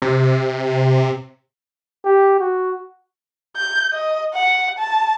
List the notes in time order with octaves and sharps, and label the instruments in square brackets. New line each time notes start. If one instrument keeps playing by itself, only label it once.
[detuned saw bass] C3
[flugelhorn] G4
F#4
[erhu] G6
D#5
F#5
A5